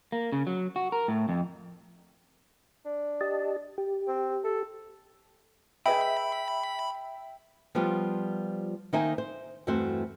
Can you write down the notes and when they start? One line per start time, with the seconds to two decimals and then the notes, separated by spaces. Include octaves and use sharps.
0.12 A#3
0.32 C#3
0.47 F#3
0.76 F#4
0.92 A#4
1.08 A2
1.29 F2
2.85 D4
3.21 G4 D#5 A5
3.78 G4
4.08 C4
4.44 A4
5.86 G#4 B4 D#5 E5 G5 B5
7.75 F3 G3 B3 F4 G4
8.93 D#3 A#3 D#4 C5 E5 G#5
9.18 C5
9.67 E2 G2 A3 C4 F#4 C5